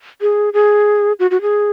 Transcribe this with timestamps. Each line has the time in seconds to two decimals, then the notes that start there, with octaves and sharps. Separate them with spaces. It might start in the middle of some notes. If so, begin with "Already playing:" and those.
0.21 G#4
0.53 G#4
1.19 F#4
1.31 F#4
1.42 G#4